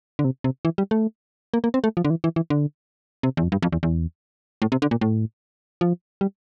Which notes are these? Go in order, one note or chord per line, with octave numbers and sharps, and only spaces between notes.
D3
C3
C3
E3
G3
A3
A#3
A#3
C4
A3
F3
D3
E3
E3
E3
D3
C3
E2
F2
G2
F2
E2
E2
A2
C3
D3
A#2
A2
F3
G3